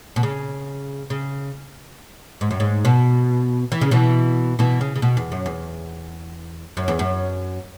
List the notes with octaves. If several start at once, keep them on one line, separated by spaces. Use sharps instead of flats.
B2
C#3
C#3
G#2
F#2
G#2
B2
E3
C#3
B2 E3
B2 E3
C#3
C#3
B2
E2
F#2
E2
F#2
E2
F#2